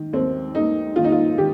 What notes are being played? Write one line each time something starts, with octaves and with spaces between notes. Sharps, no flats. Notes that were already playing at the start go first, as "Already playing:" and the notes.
Already playing: D#3
D#2 C4
D#2 D#4
D#3 F4
D#4
F4
D#3 G4